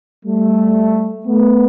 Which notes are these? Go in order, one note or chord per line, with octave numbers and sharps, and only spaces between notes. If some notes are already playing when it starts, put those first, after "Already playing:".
G3 A3
A3 B3